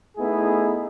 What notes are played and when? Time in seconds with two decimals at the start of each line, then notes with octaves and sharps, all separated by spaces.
0.18 A3 B3 D#4 E4 G#4